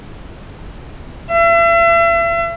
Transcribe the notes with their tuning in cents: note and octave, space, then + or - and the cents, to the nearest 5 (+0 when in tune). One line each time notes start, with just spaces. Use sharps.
E5 +40